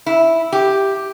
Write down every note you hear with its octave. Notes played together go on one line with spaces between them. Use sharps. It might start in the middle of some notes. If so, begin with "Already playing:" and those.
E4
G4